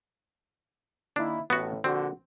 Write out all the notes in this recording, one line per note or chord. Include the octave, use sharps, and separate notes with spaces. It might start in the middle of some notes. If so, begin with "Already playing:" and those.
D#3 A#3 D4 E4
A1 A2 B3 F#4
A#1 D3 C4 F#4